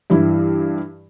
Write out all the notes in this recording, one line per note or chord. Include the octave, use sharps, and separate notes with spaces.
G2 E3 E4